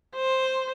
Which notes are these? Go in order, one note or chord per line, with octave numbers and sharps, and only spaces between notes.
C5